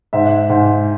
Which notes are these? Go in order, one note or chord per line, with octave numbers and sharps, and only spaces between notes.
G#2 E5
G#2